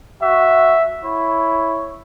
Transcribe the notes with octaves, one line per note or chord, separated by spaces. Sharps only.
F#4 E5
E4 C#5